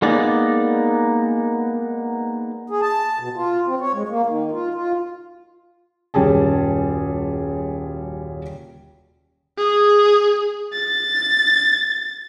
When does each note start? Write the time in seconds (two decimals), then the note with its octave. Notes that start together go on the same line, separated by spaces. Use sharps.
0.02 G#3 A#3 B3 D#4 D5
2.70 G#4
2.82 A5
3.19 B2
3.36 F4
3.67 C4
3.80 C#5
3.93 G#3
4.09 A#3
4.26 D#3
4.51 F4
4.74 F4
6.14 D#1 F#2 G3 C#4 G#4 A5
9.58 G#4
10.74 A6